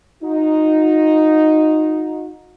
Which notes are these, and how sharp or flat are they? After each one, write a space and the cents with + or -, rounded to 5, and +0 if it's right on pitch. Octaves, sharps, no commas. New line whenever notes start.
D#4 +0 F#4 -40